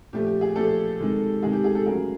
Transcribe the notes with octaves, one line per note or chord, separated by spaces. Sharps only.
A#2 F3 A3 G4
G4
G#4
A#2 F3 A3 G4 A4
C3 D#3 G#3
C3 D#3 G#3 G#4
G4
G#4
G4 A4
C#3 F#3 A3 G#4 A#4